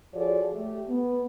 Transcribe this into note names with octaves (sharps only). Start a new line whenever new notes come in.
F3 F#4 G#4 A4 C#5 D5
A3 G4
B3